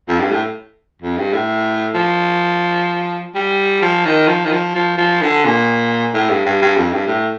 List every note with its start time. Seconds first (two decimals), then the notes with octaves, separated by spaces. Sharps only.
0.08 F2
0.20 G2
0.31 A2
1.02 F2
1.18 G2
1.33 A2
1.94 F3
3.35 G3
3.82 F3
4.05 D#3
4.27 F3
4.45 D#3
4.52 F3
4.75 F3
4.98 F3
5.21 D3
5.45 A#2
6.14 A2
6.30 G2
6.46 G2
6.62 G2
6.77 F2
6.93 G2
7.07 A2